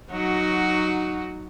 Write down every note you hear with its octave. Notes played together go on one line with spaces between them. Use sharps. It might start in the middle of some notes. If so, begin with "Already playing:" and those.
F#3 D#4 F#4